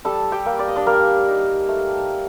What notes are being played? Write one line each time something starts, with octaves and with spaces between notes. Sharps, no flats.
G3 A4 A5
G4 G5
A#3
D5
D#5
D4 D5
G3 A#3 A#4
D#4
A3